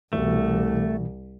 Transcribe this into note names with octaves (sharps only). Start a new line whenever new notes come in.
C2 B2 E3 A3